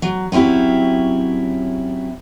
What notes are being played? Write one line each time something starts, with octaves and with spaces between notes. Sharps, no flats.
F#3
F#3 C4 C#4 E4 G4